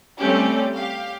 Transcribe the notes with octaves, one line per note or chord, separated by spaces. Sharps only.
G3 A3 C4 C#4 G4
G4 F5